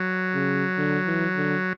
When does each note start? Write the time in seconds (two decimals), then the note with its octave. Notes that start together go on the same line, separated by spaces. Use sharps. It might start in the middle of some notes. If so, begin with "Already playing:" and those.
Already playing: F#3
0.34 C#3
0.78 D3
1.06 E3
1.35 D3